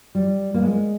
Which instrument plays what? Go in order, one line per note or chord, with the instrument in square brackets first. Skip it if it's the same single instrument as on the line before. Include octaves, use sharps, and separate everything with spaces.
[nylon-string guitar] G3
A#3
G#3